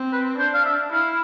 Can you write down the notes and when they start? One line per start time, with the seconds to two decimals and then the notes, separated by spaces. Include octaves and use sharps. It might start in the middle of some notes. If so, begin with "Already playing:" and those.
Already playing: C4
0.13 B4
0.39 D4 C5
0.54 F5
0.65 E5
0.92 E4 F5